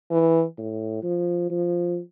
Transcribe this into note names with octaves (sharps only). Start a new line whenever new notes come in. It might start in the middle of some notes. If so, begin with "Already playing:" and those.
E3
A2
F3
F3